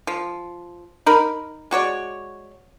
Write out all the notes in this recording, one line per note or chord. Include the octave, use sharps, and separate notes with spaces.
F3
D#4 A#4 B5
G#3 F#4 C#5 D5